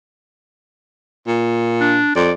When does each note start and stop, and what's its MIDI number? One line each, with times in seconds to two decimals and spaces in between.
1.27 2.02 46
1.81 2.15 62
2.16 2.32 41
2.16 2.32 74